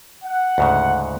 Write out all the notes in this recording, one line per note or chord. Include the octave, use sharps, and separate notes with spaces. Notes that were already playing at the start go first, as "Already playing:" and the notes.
F#5
D2 G#2 C#3